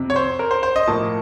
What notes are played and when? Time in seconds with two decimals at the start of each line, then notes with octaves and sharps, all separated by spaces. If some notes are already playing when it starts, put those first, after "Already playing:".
Already playing: F2 C3
0.10 C#5
0.16 C5
0.39 A#4
0.51 C5
0.63 C5
0.76 D#5
0.87 A2 F3 A#3 A5